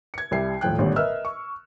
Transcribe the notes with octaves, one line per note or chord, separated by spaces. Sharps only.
G#6 C#7
C2 G3 E5 C7
D#1 A2 F3 G5 F#6
G#1 A#2 D3 G3 C#5
A#4 B4 D#5 E5 E6 F6
C#6